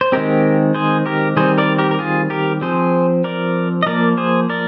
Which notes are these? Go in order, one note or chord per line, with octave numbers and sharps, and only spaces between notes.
C5
D#3 G#3 C4 G4 A#4
G#4 C5
G4 A#4
D#3 G3 C4 G#4 C5
A#4 D5
G4 A#4
A#4
F4 G#4
G4 A#4
F3 C4 G#4 C5
A#4 D5
D#5
F3 A#3 A#4 D5
G#4 C5
A#4 D5